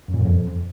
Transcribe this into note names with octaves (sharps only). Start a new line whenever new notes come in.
F#2
A#2
F#2
F2